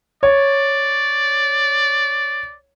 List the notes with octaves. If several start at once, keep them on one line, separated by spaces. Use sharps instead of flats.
C#5 D5